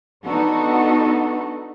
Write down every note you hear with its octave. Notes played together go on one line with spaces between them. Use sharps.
B3 D4 D#4 F#4 A4